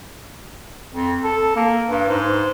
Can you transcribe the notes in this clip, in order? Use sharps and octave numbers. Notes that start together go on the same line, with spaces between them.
F2
A4
A#3
G2
G#2